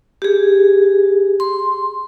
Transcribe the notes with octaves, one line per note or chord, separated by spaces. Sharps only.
G4 G#4
C6